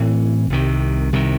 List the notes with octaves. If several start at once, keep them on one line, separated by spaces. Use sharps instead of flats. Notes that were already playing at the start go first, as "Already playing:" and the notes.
Already playing: A2 E3 C4
C2 C3 D#3
C2 C3 D#3